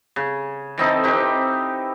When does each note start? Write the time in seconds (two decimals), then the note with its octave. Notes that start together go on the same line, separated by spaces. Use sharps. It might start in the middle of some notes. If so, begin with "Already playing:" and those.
0.16 C#3
0.78 E3 C4 D#4 A4
1.03 C4 D#4 G4 B4